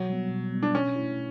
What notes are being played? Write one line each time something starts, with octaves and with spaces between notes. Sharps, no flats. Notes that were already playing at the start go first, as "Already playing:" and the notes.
Already playing: B2 F#3
G3 B3
B2
G3 B3
D4
B2 C#4
A3 E4